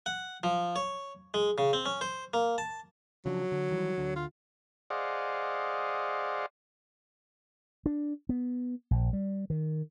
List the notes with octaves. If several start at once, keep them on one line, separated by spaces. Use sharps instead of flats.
F#5
F3
C#5
G#3
C#3
C4
C#4
C5
A#3
A5
C#3 F3 F#3 D4
D3
D#3 E3 G3
D2 D3
F4
G#4 C5 D5 D#5 F5 F#5
D4
B3
A#1
G3
D#3